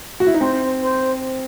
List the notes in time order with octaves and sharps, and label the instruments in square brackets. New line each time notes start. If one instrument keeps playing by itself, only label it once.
[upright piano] F#4
E4
D#4
[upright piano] C4 [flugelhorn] C5
[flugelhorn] C5